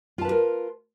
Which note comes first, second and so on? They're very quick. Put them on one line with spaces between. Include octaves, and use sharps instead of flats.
F4 A5 B4 G4 A#4